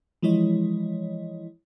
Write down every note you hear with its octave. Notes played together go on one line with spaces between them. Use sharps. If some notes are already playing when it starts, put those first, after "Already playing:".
E3 F3 G#3 E4 C#5 D#5